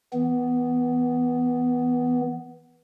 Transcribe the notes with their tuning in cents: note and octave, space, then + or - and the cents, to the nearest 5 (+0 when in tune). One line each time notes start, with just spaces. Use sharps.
E3 -15 B3 +10